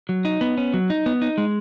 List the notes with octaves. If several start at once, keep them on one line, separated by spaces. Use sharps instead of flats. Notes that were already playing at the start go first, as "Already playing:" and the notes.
F#3
D#4
B3
C#4
F#3
D#4
B3
D#4
G#3